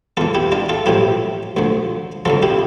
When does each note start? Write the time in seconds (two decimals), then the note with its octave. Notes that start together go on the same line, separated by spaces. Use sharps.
0.17 E2 E3 F4 A4
0.35 E4 G4
0.52 D4 F4
0.69 F4 A4
0.86 A1 A2 F3 E4 G4
1.57 D2 D3 F3
2.25 F2 D3 F3 F4 A4
2.43 E4 G4